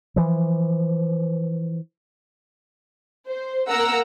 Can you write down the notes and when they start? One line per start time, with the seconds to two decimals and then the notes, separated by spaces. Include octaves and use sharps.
0.16 E3 F3
3.27 C5
3.67 A#3 A#4 F#5 A#5 E6